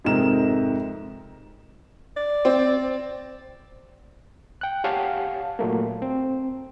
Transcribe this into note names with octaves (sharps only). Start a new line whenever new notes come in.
F2 G#2 C3 D#4 A#4 E7
D5
C4
G5 F#6
G4 C#5 F5 F#5 G#5 A5
A#2 F#3 A3 A#3
C4